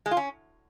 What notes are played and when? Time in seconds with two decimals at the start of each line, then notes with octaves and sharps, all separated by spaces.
0.06 G#3
0.11 F4
0.17 C#4